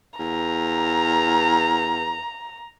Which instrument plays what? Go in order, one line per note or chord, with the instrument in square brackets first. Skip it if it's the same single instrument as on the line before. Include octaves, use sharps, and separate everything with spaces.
[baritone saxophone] E2 [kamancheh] A#5